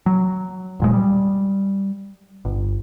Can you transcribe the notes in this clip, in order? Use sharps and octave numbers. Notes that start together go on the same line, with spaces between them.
F#3
D#1 A#2 G#3
G3
G1